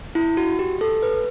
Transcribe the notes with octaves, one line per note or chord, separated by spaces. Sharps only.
E4
F#4
G4
A4
B4